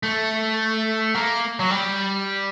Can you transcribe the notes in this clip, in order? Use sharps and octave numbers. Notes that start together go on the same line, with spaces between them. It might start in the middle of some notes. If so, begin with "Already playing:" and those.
A3
A#3
F#3
G3